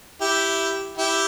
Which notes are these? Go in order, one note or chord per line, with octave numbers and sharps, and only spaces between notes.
E4 G4
E4 G4